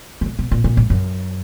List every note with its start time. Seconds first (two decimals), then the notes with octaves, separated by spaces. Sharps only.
0.21 C#3
0.26 B2
0.39 B2
0.52 A#2
0.64 A#2
0.77 G#2
0.90 F#2